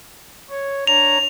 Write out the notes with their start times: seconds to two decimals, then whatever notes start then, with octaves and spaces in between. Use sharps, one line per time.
0.50 C#5
0.87 D4 C#5 A#5 F7